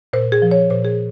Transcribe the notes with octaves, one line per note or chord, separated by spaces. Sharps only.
A#2 C5
G#4
F3
C#5
A#2 C5
G#4